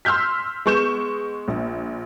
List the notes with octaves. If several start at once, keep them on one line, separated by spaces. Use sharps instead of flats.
C6 E6 F6 G6 B6
G#3 B3 C#6 G6 E7
A#1